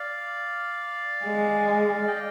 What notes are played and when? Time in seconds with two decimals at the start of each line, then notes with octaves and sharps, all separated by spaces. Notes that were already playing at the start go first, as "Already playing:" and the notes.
Already playing: D5 F5
1.24 G#3
2.07 D#5 G5